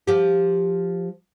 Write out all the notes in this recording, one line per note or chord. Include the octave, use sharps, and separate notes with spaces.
F3 G4